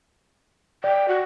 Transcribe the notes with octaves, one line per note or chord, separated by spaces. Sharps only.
D5 G5
F#4